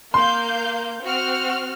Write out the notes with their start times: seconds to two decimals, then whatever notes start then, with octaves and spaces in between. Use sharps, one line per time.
0.14 A#3 F5 C6 G6
1.03 C4 F#4 F6